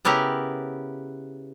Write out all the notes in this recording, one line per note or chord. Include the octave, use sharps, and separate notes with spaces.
C#3 B3 E4 G4 A#4 B4